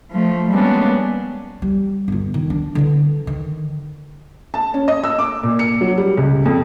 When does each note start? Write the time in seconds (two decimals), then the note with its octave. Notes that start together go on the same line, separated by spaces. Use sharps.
0.12 F3 A3
0.51 G3 G#3 A#3 B3 C#4 D4
1.62 G3
2.08 G1 F4
2.34 D#3
2.50 D4
2.75 D3 E3
3.27 D#3
4.54 A5
4.74 C#4
4.88 D#5
5.04 E6
5.19 D6
5.43 A#2
5.59 C#7
5.81 F#3
5.98 G3
6.17 C#2
6.46 F2